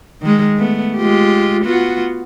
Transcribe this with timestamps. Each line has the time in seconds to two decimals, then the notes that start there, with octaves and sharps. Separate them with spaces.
0.22 D#3 G#3
0.57 A3 B3
0.97 G#3 F4 G4
1.64 B3 F4 F#4